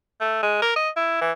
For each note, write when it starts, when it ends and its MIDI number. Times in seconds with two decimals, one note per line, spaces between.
0.21 0.38 57
0.43 0.59 56
0.62 0.75 70
0.76 0.90 75
0.97 1.17 64
1.21 1.32 52